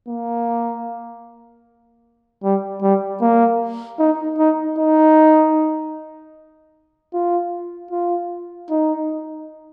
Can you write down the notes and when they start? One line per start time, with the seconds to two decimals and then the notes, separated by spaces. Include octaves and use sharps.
0.08 A#3
2.43 G3
2.82 G3
3.21 A#3
3.99 D#4
4.38 D#4
4.78 D#4
7.14 F4
7.91 F4
8.70 D#4